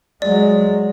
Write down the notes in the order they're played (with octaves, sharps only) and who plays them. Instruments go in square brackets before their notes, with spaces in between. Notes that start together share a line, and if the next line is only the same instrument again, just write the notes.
[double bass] F#3 G#3 [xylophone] D5